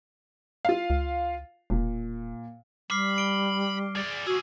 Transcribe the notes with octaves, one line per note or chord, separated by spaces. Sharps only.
F4 F5
C#2
E1 A#2
G3 B5 D6 F6 C7
D7 G7
G#4 D5
C2 F#4 G#4 E6